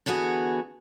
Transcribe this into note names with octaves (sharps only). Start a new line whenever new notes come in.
D3 E3 B3 F#4 G#4